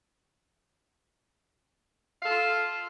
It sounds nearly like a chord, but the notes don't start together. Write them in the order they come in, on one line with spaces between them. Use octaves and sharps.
F5 A4 F4